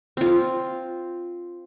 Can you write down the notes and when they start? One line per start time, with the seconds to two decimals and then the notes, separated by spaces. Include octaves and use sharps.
0.17 C4 F4